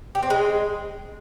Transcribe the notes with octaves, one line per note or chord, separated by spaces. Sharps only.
G4
C4
G#3